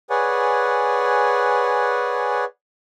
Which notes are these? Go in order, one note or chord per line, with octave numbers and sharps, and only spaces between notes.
G#4 B4 C#5 D5 F#5 G#5